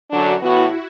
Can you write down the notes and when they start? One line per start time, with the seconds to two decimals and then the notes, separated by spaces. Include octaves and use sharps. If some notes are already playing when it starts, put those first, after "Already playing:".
0.10 F#2 D3 F#3 D4 F#4
0.41 A2 E3 B3 E4 F#4